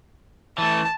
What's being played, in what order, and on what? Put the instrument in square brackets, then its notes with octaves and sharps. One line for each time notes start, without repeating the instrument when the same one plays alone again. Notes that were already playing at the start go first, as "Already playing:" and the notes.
[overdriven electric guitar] E3 A3 [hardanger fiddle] A5